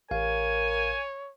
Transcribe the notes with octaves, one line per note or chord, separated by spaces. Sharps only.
A1 A#4 C#5 F5 G#5